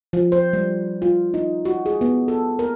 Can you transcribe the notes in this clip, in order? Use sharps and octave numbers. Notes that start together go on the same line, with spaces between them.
F3
C5
G3
F4
D#4
F#4
G#4
B3
A4
A#4